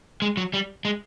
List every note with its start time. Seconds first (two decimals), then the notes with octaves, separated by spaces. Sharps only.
0.22 G#3
0.37 F#3
0.54 G3
0.85 G#3